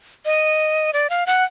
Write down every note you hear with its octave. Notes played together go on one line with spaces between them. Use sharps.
D#5
D5
F5
F#5